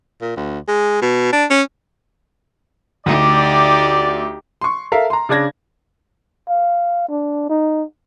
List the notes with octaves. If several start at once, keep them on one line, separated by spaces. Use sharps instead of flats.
A#2
D2
G#3
B2
D4
C#4
D2 D#4 G4 D5
C6 C#6
A4 A#4 E5 F5
A#5 C6
C#3 D4 D5 G#6 A#6
F5
D4
D#4